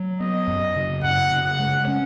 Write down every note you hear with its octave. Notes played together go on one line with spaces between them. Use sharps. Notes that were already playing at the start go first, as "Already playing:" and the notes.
Already playing: F#3
B3 D#5
F#2
C#3
F#2 F#5
C#3
F#5
G#3
C#4